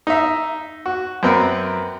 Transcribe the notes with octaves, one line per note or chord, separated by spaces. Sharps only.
D#4 E5
F#4
F#2 C4 A#4 B4 F#5